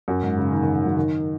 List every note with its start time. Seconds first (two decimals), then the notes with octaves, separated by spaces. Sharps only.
0.08 F#2
0.23 G#2
0.38 C#3
0.52 D#3
0.63 D#3
0.75 D#3
0.86 F#3
0.97 D#3